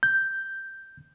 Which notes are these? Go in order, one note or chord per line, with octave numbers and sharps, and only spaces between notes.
G6